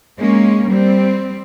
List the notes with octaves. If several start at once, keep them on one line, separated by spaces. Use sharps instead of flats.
G#3 A#3 C#4
G3 C4